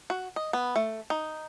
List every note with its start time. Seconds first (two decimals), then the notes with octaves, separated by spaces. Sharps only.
0.10 F#4
0.36 D#5
0.53 B3
0.76 A3
1.10 D#4